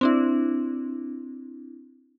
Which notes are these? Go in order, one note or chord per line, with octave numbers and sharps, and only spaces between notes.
C4 D4 E4